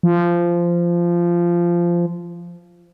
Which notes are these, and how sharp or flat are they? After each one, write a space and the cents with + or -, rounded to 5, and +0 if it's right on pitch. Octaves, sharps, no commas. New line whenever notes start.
F3 -15